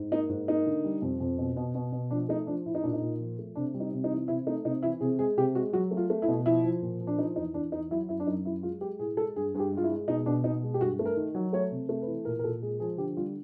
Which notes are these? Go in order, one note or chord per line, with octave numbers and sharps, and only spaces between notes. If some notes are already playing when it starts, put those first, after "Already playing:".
Already playing: G#2
A#3 D#4
G#2
A#3 D#4
D3
G3
F2
F2
B2
B2
B2
B2
F3 D4
A3 D#4
F3 D4
A2 E4
D#4
A#2 D4
D#4
A#2
F3
A3
C3 D4
G3
D#4
C3
D#4
E3
C3 E4
A3 D#4
C3 D#4
E3 E4
C3 G#4
G#3 G#4
C3 G4
G#3 F#4
F#3 F#4
A3
F4
A3
E4
B2
F3 E4
F3
A#2
F3
D4
F3 D#4
E2 D#4
E2 D4
E2 D#4
F#3 E4
F#2 E4
D4
F#2 D#4
F#3 E4
G#3 F4
G#3 G4
A2 G#4
G#3 A4
G2 G#4
G2 G4 G#4
G#3
F4
E4
G#3
B2 D#4
B2 D4
B2 D#4
G#3
G4
G2 F#4
A3
A#4
D#3
F#3
A3 C#5
C3
A3
B4
E3
A#2 A#4
A#4
A#2 A4
G#3 G#4
F3 G#4
D3 G4
G3 F4